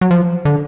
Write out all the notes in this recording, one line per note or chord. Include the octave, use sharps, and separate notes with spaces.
F#3
F3
D3